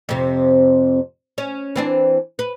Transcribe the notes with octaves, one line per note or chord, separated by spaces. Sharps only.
F2 C3
C#4
E3 C4 D4
B4